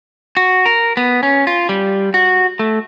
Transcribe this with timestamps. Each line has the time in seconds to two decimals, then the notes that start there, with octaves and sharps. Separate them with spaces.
0.37 F#4
0.66 A#4
0.97 B3
1.23 C#4
1.47 F4
1.69 G3
2.14 F#4
2.59 A3